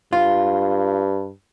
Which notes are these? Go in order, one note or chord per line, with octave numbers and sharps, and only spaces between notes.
G2 F4